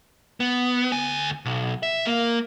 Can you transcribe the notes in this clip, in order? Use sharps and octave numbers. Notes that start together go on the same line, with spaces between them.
B3
D2 G#5
B1
E5
A#3